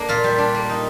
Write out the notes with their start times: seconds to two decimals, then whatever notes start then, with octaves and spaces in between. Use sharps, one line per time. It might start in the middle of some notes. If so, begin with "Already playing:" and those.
Already playing: A#3 D4
0.09 A#2 F4
0.24 G3
0.38 D4
0.54 A#3
0.69 D#4